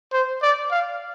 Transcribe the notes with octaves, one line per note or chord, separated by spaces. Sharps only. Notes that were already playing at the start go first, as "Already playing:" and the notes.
C5
D5
F5